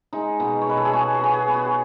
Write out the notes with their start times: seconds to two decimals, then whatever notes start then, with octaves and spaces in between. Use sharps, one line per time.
0.13 G#3 D#4
0.40 B2
0.61 C#5
0.67 B2 B4
0.77 A4
0.85 G#4
0.93 B3 F#4
1.14 G#4
1.20 B3 F#4
1.34 G#4
1.48 B3
1.54 F#4
1.65 G#4